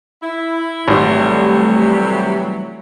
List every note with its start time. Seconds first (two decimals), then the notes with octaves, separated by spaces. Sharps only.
0.23 E4
0.88 G#1 C3 E3 F#3 G3 A3